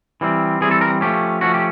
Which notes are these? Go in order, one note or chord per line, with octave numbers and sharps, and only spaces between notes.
E3 G3 C4
E3 G3 C4 G#4
A4
A#4
F3 A3 C#4 G4
F3 A3 C#4 F#4
G4